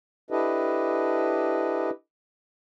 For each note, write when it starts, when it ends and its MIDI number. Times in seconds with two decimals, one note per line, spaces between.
0.31 1.90 62
0.31 1.90 64
0.31 1.90 67
0.31 1.90 69
0.31 1.90 71
0.31 1.90 75